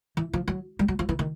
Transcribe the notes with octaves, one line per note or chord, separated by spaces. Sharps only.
E3
F3
F#3
G3
F#3
F3
E3
D#3